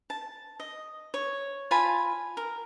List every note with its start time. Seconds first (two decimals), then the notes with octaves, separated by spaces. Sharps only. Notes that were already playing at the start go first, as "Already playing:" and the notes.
0.10 A5
0.60 D#5
1.14 C#5
1.71 F4 G#5 A5 B5
2.37 A#4